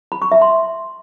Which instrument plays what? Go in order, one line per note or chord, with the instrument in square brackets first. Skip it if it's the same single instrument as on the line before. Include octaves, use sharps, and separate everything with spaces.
[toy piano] B5
C#6
E5
C6